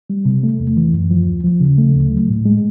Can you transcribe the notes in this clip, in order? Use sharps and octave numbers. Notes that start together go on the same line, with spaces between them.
G3
C3
A3
E2
E3
F#2
F3
D#2
F3
C#3
A3
D2
F#3
A2
G#3